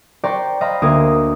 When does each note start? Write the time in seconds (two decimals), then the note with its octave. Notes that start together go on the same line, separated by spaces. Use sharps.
0.24 C5 D5 G5 A#5 C#6
0.61 C5 D#5 F5 A#5 B5
0.82 D2 A#3 D#6 G#6